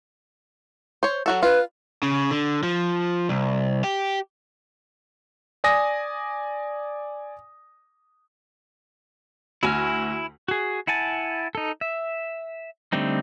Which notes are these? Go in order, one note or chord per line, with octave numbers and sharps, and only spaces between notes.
C5 C#5
F#3 F#4 A4
F4 B4
C#3
D3
F3
C2
G4
D5 G#5 D#6 A#6
D2 E4 F#4 G#5 F6
F#4 G#4
E4 F#5 G#5 A5
D#4 A4
E5
D3 G3 A3 C4 D#4